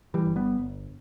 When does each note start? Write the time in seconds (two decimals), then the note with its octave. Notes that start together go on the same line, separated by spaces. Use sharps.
0.14 E3 G3
0.25 G1
0.36 G3 B3
0.58 G1